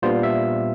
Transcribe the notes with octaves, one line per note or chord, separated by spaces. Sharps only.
A#2 G3 B3 D4 F4 C5
E5